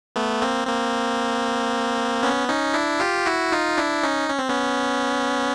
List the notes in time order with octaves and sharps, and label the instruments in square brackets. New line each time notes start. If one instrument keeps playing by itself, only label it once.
[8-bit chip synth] A3 B3
A#3 C4
A#3 C4
B3 C#4
C#4 D#4
D4 E4
F4 G4
E4 F#4
D#4 F4
D4 E4
C#4 D#4
C#4
C4
B3 C#4